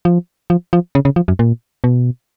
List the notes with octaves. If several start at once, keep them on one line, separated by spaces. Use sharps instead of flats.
F3
F3
F3
C#3
C#3
F3
F#2
A#2
B2